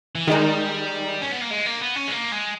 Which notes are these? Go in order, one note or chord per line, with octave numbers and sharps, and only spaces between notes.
E3
D#3 G3 G#3 D#4
C#4
B3
A#3
G#3
A#3
B3
C#4
G#3
A#3
G#3